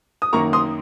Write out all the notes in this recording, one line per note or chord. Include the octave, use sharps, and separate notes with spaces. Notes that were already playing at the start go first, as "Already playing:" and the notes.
D#6
F#2 D#3 A#3 A#5 C#6
C6 D#6